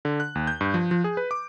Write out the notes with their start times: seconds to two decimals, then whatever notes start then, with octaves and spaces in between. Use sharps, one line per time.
0.05 D3
0.20 F#6
0.35 D#2
0.47 G6
0.61 G2
0.74 F3
0.91 F3
1.04 G#4
1.17 B4
1.31 D6